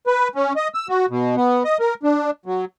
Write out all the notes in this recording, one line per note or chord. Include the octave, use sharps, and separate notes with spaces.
B4
C#4
D#5
E6
F#4
B2
B3
D#5
A#4
D4
F#3